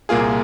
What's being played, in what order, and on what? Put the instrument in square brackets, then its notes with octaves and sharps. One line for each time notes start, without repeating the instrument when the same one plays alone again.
[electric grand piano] C2 A#2 A#3 F4 G#4